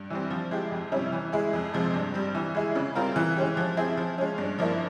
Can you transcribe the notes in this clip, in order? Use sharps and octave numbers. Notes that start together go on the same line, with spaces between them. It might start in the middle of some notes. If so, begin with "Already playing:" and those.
Already playing: G2
E3 G3 C4
F3
G#3 E4 G4
F2
C3 G3 C#4 E4
E3
G#3 E4 G#4
F2
C3 F3 G#3
G2
G3 C4
E3
G#3 E4 G#4
C#3
G3 C4 F4 A#4
E3
G#3 C#4 G4
F3
C4 E4 G#4
F3
G#3 C#4
G2
F3 A#3 E4